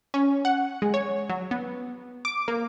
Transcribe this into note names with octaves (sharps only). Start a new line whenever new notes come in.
C#4
F#5
G#3
C#5
F#3
B3
D6
A#3